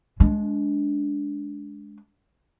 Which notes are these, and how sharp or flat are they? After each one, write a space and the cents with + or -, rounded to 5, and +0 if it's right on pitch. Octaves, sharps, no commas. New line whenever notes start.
G#3 +10 D4 -15